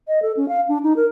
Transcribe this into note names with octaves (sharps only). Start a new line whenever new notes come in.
D#5
A4
C#4
F5
D4
D#4
A#4